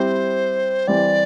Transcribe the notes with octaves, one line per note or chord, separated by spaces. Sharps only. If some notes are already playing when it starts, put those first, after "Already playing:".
Already playing: G3 C4 E4 G4 C5
E3 G3 C4 G4 D5